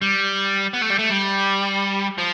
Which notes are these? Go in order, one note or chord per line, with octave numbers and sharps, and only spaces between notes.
G3
B3
A3
G3
A3
G3
F3